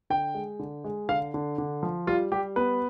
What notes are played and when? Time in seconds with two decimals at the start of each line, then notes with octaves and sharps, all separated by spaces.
0.10 D3 G5
0.34 G#3
0.59 D3
0.84 G#3
1.09 D3 F5
1.34 D3
1.58 D3
1.83 F3
2.07 G3 F4
2.32 G3 G4
2.56 B3 B4